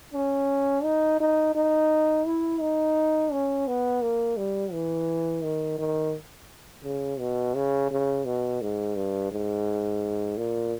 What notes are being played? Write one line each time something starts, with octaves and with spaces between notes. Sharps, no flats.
C#4
D#4
D#4
D#4
E4
D#4
C#4
B3
A#3
G3
E3
D#3
D#3
C#3
B2
C#3
C#3
B2
G#2
G2
G#2
A#2